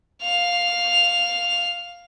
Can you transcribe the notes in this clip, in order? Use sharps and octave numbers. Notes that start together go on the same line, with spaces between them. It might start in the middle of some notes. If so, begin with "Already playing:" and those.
F5 F7